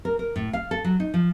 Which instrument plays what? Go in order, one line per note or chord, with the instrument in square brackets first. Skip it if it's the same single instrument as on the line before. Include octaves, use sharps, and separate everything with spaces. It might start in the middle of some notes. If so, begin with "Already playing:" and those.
[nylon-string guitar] A#4
A#4
A2
F5
A4
F#3
D#4
F3